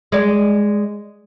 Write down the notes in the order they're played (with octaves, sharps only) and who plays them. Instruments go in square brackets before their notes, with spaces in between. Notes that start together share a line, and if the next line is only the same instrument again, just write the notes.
[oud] G#3 D5